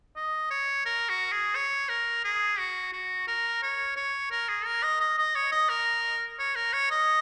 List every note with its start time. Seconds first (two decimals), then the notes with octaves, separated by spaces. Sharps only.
0.16 D#5
0.50 C#5
0.85 A#4
1.09 F#4
1.32 G#4
1.55 C#5
1.89 A#4
2.24 G#4
2.59 F#4
2.92 F#4
3.27 A#4
3.63 C#5
3.96 C#5
4.31 A#4
4.48 G#4
4.65 A#4
4.83 D#5
5.00 D#5
5.18 D#5
5.35 C#5
5.52 D#5
5.69 A#4
6.39 C#5
6.55 A#4
6.73 C#5
6.90 D#5